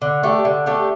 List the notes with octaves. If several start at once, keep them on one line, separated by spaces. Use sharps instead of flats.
D3
A3 D4 G4
D3
A3 D4 G4